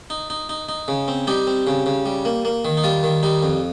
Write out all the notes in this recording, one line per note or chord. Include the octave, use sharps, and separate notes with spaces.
D#4
D#4
D#4
D#4
C#3
C4
G3 D#4 G4
C4
C#3
C#3
G3
A#3
A#3
D#3
D#4
G3 F4
D#3
G3 D#4
F2